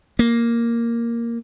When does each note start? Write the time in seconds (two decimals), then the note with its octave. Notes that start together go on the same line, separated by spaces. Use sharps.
0.19 A#3